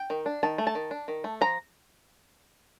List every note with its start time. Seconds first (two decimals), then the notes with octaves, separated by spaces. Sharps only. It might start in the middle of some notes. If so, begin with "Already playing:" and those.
Already playing: G5
0.10 D#3
0.26 D4
0.43 D#3 A5
0.58 A3
0.67 A5
0.75 D#3
0.91 D4
1.08 D#3
1.24 A3
1.41 F3 A#5